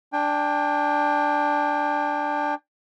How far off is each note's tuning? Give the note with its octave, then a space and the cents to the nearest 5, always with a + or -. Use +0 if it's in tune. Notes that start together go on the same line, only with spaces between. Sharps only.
D4 +0 G5 +30